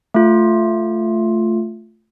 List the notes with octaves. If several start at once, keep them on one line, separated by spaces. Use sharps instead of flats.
A3 F4